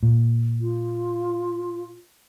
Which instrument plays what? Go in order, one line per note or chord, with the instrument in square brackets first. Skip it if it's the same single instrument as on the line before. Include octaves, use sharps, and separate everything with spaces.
[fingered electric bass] A#2
[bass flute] F4